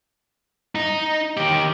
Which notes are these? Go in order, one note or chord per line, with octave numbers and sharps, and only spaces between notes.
D#4
D#3 G4